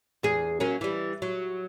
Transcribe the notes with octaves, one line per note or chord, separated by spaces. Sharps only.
E2 G#4
F#3 A#3 C#4
E3 G3
F#3